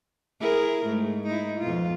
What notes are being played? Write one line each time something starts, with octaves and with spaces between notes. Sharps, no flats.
E4 G#4 A#4
G#2 A3
D#4 E4
F2 B2 F4